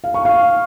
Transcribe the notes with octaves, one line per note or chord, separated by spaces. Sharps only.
F5
C#6
F5